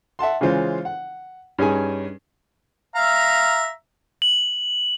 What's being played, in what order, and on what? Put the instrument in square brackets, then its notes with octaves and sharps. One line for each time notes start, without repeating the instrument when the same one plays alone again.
[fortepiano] E5 F#5 A5 C6
C#3 E3 G#3 C#4 F4 C5
F#5
G2 C#4 D#4 G#4 G#5
[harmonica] E5 F5 A#5
[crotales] F#7